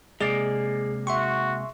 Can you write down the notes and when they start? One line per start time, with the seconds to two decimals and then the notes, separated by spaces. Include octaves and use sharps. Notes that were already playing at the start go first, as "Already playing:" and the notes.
0.21 C3 G#3 A#3 G#4 D5
1.07 F#4 E5 C6 C#6